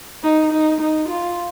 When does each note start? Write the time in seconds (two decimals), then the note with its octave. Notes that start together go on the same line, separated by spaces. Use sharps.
0.23 D#4
0.52 D#4
0.81 D#4
1.08 F4